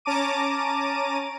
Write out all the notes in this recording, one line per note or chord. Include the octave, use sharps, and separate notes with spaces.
C#4 A5 A#5 D6 D#7